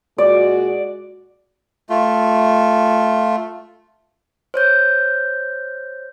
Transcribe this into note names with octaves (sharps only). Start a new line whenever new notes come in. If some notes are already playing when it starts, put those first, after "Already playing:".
A#2 G#3 F#4 D5
A3 F4
C5 C#5 G6